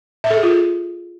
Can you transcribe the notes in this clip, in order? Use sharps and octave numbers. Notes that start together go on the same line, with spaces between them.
E5
A4
G#4
F4